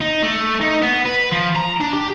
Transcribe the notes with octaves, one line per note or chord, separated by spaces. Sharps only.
D#4
A3
D#4
B3
B4
F3
A#5
D4
G4